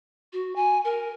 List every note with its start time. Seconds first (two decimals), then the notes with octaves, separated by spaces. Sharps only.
0.33 F#4
0.56 G#5
0.84 A#4